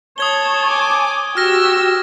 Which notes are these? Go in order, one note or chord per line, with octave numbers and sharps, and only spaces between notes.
C#5 A5 D#6 G#6 G7
G#5 D6
F#4 G4 E6 F6 A#6